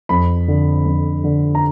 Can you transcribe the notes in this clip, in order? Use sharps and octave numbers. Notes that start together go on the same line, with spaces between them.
F2 B5
D3
F2
D3
A#5